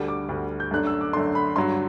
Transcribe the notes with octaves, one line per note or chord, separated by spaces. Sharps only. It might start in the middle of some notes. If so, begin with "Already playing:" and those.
Already playing: D2 D3 G3
D6
D2 D3 G3
G6
F#2 D3 A3 D4 F#6
E6
D6
F#2 D3 A3 D4 C6
B5
G2 D3 F#3 C6